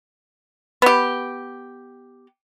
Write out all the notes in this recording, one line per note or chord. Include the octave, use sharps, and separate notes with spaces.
B3 G4